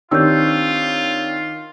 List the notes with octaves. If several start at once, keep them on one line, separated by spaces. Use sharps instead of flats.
D#3 C4 D4 F4 G4 C#5 E6 G6